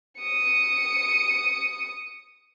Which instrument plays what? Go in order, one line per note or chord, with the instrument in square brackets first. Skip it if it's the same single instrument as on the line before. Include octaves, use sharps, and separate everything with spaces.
[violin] D#6 C#7